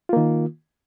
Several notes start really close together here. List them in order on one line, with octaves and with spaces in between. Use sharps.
F4 A#3 D#3